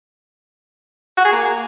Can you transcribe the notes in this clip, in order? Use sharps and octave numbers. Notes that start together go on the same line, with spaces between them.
F#4
G#4
A#3